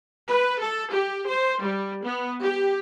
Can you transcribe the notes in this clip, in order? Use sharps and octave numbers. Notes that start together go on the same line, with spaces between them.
B4
A4
G4
C5
G3
B3
G4